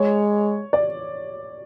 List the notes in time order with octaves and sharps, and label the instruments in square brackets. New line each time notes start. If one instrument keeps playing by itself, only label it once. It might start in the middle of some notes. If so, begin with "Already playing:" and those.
Already playing: [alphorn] G#3 [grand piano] C#5
[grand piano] D5